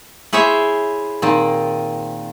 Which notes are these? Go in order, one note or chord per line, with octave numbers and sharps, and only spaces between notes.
E4 G#4 C5 C#5 E5
A#2 D#3 C4